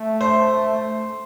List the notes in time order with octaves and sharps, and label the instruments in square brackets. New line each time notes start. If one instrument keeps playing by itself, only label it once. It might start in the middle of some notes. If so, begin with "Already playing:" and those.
Already playing: [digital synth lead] A3
[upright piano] C5